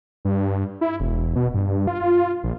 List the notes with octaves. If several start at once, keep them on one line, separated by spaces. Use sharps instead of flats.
G2
E4
E1
B2
G2
F4
A#1